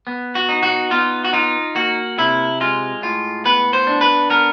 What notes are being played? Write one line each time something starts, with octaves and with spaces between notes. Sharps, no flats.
B3
F#4
D#4
F#4
B3 F4
F#4
D#4 F4
A#3 F#4
C3 E4
G#3 F4
A2 F4
B3 B4
C5
D4
B4
B3 A#4